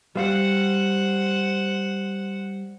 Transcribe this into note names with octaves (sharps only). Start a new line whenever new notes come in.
G3 C5 F5 F#5